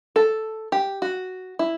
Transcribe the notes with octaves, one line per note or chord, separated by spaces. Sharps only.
A4
G4
F#4
E4